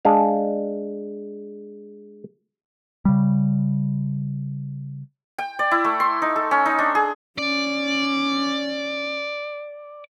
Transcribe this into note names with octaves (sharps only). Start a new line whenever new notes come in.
G#3 D4 F5
C#3 G3
G5
D5
E4
A3
C6
D#4
A4
C#4
D#4
D4
G#4
C#4 D5